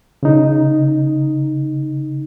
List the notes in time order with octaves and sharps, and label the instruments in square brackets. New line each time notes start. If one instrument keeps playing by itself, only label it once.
[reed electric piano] C#3 D#4